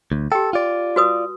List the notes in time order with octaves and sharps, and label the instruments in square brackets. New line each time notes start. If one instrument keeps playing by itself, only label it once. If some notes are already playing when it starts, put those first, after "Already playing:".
[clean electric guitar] D2
[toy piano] G4 G5 [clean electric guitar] A4
[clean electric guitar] F4 D5
[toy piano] F#4 B4 D#6